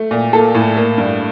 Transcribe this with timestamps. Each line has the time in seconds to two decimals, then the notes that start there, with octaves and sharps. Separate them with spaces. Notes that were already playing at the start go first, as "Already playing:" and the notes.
Already playing: A3
0.11 A#2
0.33 A#3 A4
0.55 A2
0.77 A#3
0.98 G2